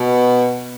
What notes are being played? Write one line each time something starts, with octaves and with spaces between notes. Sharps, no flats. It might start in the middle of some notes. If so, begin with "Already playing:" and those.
Already playing: B2